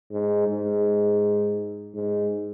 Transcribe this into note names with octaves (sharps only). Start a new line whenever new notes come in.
G#2
G#2
G#2